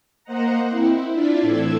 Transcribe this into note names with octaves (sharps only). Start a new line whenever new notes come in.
A#3 C5 D#5 F#5 A#5
C4 E4
D4 E4 F4 D5 E5
A2 E3 C4 A4 E6 G#6